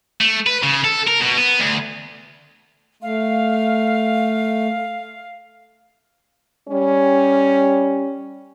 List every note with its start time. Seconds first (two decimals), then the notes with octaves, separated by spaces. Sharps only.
0.21 A3
0.46 B4
0.63 C#3
0.85 A4
1.08 A#4
1.21 B2
1.38 B3
1.60 D2
3.03 A3 F5
6.69 G3 C#4